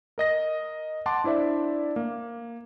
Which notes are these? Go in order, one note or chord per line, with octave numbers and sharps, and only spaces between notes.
A#4 D#5 A#6
F#5 A5 C6 D6
D4 E4 C5 D5 E5
A#3